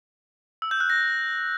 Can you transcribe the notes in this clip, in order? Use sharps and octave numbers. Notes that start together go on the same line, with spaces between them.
E6
G6
F#6
A#6